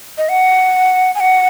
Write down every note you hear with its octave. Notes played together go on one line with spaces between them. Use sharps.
D#5
F#5
G#5
F#5